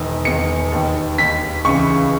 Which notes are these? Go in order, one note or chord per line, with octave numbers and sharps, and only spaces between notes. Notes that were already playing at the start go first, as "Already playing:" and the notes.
Already playing: E1 E2 D#3
E1 E2 D#3 C#7
D#2 D#3
D#2 D#3 B6
C#2 C#3 E3 C#6